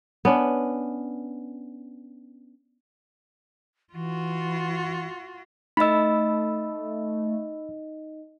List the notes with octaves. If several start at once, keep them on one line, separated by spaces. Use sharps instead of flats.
B3 C#4 D4
E3 F4 F#4
A3 D#4 D#5 B5 E6